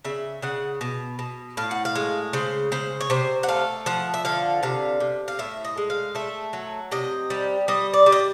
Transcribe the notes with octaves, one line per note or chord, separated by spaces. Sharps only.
C#3 E5
C#3 F#5
B2
B2
A2 F5
F#5
F5
G#3
C#3 C5
C#3 C5
C#5
C3 C5
F#5
A3 F5
F3 F#5
E5
D3 F5
C3 F5
C3
F5
A2 E5
D#5
G#3
F5
A3 E5
F#3
C3 D#5
G3
G3 D#5
D5
G3
D#5